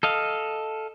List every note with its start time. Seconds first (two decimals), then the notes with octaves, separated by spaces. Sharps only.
0.03 A4 D#5 F5